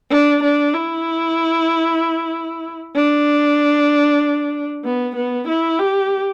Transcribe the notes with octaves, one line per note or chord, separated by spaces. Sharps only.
D4
D4
E4
D4
B3
B3
E4
G4